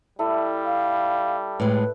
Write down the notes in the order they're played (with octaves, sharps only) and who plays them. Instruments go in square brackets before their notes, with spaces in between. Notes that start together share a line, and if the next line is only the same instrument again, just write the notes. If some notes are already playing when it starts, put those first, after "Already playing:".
[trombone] G3 [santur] E4 A4 D5
[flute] F5
[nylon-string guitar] A2 G#3 [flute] B4